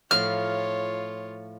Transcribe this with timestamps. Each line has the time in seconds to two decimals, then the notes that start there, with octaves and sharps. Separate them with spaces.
0.11 A2 F3 F4 C#5 F6